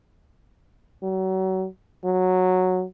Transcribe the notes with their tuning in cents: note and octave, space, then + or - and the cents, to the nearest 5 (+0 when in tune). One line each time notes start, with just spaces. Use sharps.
F#3 +30
F#3 -5